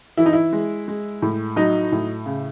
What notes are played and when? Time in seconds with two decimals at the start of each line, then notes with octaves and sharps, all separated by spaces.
0.17 E3 E4
0.26 D#4
0.33 E4
0.53 G#3
0.88 G#3
1.22 A2
1.56 F#3 D#4
1.92 A2
2.26 C#3